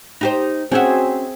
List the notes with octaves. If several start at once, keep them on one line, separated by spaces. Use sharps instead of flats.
D#4 G4 C5
C4 C#4 F#4 G#4 E5